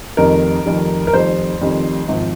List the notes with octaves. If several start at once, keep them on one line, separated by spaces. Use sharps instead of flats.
F1 F2 D#3 G3 A#4
F1 F2 D#3 G3
A#4
F1 F2 D#3 G3 C5
F1 F2 D#3 G3
G#1 F3